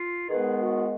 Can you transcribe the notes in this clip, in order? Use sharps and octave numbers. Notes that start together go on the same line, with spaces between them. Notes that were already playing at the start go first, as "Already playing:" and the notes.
Already playing: F4
G#2 D#3 G#3 B3 G#4 B4
F#4